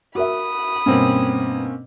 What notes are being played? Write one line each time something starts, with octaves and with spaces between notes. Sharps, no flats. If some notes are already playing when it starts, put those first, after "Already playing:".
F#4 A#4 E5 B5 D#6
G2 B2 A#3 C4 C#4